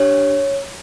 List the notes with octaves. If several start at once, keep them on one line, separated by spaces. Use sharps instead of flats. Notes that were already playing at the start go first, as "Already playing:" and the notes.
Already playing: D4 G4 C#5